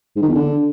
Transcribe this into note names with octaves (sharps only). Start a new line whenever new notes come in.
G#2
D#3
E2
D3